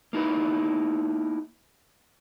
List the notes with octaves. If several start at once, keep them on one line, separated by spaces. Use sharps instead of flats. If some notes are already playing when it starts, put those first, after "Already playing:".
A#3 D#4 E4 B4